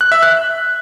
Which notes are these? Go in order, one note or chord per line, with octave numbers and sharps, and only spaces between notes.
F#6
E5
F#6